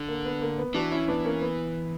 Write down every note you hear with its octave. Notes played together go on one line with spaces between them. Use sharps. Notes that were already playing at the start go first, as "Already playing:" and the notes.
Already playing: D3
A#3
B3
A#3
B3
E3 D4 F#4
C#4 E4
B3 D4
A#3 C#4
B3